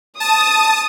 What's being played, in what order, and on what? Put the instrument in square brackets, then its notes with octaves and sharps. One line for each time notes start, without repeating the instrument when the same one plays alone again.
[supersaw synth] A5 [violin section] D#6